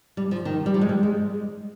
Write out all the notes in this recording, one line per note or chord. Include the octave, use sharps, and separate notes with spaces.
G3
F3
D#3
G3
F3
G#3
G3
G#3